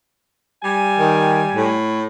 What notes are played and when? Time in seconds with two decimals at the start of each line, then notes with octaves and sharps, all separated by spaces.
0.63 G3 G#5
0.99 D#3
1.54 A2